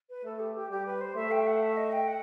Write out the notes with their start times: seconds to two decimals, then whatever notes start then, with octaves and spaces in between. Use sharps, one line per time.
0.09 B4
0.24 A3 A4
0.39 G4
0.55 G4
0.70 G3 G4
0.86 B4
1.00 C5
1.15 A3 E5
1.31 G5
1.40 E5
1.46 F#5
1.62 E5
1.76 D#5
1.92 G5
2.07 F#5